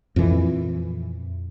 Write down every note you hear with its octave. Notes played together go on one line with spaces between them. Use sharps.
F2 A#2 E3